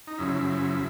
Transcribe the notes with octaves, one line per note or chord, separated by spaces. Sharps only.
D#4
F#2 C#3 F3 E4